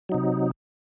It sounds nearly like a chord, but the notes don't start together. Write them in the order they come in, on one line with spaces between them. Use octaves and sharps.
F#3 D#4 C3